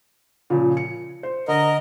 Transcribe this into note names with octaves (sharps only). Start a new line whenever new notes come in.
A#2 C#3 F3
C#7
C5
D3 A#4 D#5